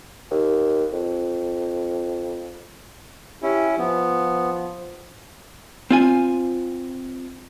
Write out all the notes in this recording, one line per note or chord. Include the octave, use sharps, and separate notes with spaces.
D#2
F2
C#4 E4 G4
F3 B3
C4 F4 G#5